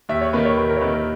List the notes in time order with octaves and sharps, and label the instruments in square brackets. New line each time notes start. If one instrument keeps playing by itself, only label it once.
[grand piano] D#2 [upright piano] E5
[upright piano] C#5
[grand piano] D#3 A#3 [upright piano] B4
[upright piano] C#5
[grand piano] D#2 [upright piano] B4
[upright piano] A#4
C#5
[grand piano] D#3 A#3 [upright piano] B4
[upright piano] A#4